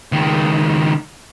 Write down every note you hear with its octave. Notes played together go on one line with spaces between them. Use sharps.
C#2 D#3